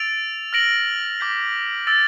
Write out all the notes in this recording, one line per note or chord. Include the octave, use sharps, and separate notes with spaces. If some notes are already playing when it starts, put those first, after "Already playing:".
Already playing: E6 A6 D7 F7
F6 A#6 D7 F#7
D6 G6 B6
E6 A6 D7 F7